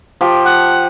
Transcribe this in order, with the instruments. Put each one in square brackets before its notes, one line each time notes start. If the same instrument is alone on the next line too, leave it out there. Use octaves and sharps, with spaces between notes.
[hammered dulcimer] F3 G4
[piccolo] F#5